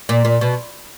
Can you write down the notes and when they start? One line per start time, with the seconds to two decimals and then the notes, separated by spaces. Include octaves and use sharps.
0.09 A#2
0.25 A#2
0.41 B2